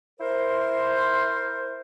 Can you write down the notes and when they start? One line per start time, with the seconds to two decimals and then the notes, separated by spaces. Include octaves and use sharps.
0.20 E4 A#4 C5